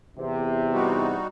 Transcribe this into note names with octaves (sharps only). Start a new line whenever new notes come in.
E2 C3
G3 D#4 F#4